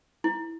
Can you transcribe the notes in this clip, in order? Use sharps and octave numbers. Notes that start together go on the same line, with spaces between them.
E4